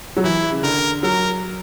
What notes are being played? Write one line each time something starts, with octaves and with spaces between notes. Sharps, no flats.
F#3
E3 E4
C#3
D3 A#4
F#3 A#4